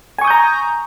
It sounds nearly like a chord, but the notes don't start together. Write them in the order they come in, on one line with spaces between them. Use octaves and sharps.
G#5 C#6 D#6 G6 A#5